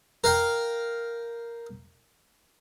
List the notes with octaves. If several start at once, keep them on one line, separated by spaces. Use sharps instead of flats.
A#4 F5 G5